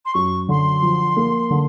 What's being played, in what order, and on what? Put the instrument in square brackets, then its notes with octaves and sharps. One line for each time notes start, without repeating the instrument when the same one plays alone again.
[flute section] C6
[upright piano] F#2 [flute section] C#6
[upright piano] D3 [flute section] C6
[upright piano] F3
A#3
D3